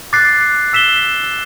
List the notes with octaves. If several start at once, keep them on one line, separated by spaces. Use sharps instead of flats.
D6 F#6 A6 C7
E6 B6 E7 G7